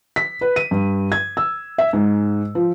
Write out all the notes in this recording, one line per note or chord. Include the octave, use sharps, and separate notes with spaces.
B6
B4
D#7
G2
G#6
E6
E5
G#2
F3